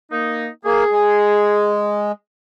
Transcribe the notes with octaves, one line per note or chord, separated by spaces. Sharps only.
A#3 D#4
A#3 G#4
G#3